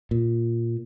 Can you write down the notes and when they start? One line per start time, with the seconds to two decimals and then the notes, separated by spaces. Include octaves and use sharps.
0.11 A#2